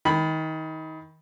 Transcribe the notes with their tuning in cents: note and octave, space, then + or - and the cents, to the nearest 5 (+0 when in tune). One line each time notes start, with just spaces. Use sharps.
D#3 +25 B5 +0